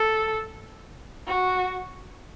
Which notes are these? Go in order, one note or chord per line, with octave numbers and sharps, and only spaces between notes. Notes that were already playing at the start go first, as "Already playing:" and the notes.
Already playing: A4
F#4